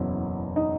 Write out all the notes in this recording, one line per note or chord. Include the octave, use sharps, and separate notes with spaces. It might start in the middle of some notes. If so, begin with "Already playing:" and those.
Already playing: F#1 E2 B2 F#3 E4
D#4